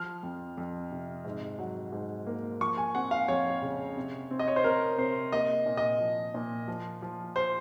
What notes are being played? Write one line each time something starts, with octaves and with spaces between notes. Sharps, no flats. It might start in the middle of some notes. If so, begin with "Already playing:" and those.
Already playing: F3 F6
F2
F2
C3
G#2
F#3
G#2
A#3
F3 C#6
G#5
C4 F#5
F5
F2 C#5
C#3
C3
C4
D#5
C#5
C5
C4 A#4
C3 C5
A#3 D#5
A#2
D#5
F3
A#2
F3
F3
C5